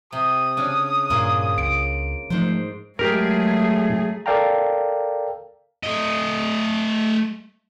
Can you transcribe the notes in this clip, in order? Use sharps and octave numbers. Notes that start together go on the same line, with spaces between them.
C3 D#6
C#3 D4
G2 A#2 A#3 F4 G#4
C#2 D7
G#2 F3 A3 C5
F#3 G#3 A3 G4 G#4 A#4
A4 A#4 D5 F5 G5 A#5
A3 D#5